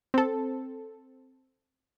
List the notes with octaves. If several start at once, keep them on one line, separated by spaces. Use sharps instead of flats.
C4 A4